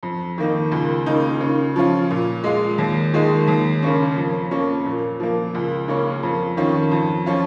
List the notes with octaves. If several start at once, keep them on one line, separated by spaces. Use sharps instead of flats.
F2
D#3 A#3 D#4
C#2
C#3 A#3 D#4
C#3
F3 C#4 F4
A#2
G#3 F4
D#2
D#3 G#3 F4
D#2
C#3 A#3 C#4
F2
F3 A#3 C#4
A#2
F3 A#3
C#2
C#3 A#3 C#4
F2
D#3 C#4 F4
F2
F3 C#4 F4